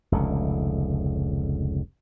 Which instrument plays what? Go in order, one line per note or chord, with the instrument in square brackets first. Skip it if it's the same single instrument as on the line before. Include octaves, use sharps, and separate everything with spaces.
[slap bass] F1 C#2 D3